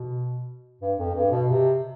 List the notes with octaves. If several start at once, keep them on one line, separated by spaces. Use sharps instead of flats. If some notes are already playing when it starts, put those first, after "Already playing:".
Already playing: B2
G2
F2
G2
B2
C3